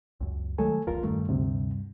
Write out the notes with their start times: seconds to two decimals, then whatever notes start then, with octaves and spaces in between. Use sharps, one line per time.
0.20 C#2 F#2
0.58 D#3 F#3 G#3 A3 A4 G#5
0.87 E1 B1 E2 F4 A#4
1.03 G2 D#3 A3
1.29 D2 C3